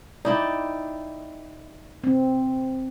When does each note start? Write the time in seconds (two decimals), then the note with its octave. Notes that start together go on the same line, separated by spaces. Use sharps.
0.25 D#4 E4 D5 G5
2.04 C4